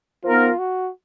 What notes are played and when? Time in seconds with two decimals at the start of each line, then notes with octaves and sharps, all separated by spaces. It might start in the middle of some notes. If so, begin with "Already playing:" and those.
0.24 F3 B3 D#4 F4 A#4
0.59 F#4